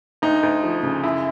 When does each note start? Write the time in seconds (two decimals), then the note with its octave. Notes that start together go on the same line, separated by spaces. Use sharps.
0.22 D2 D#4
0.43 D2
0.63 F3
0.83 C#3
1.04 F#2 E4